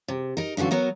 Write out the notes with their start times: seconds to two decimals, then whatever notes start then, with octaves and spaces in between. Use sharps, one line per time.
0.08 C3
0.37 D#4 A#4
0.57 F#2 D3 E3 F4 F#4
0.71 F#3 B3 F#4 A#4